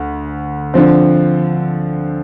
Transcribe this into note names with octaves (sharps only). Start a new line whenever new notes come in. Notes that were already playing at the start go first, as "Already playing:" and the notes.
Already playing: D2
D3 F3 C4